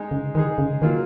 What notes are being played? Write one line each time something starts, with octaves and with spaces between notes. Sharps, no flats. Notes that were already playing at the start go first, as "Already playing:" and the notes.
Already playing: G#3 D#4 G#4
C#3
D#3 G#3 D#4 G#4
C#3
D#3 F#3 A#3 F4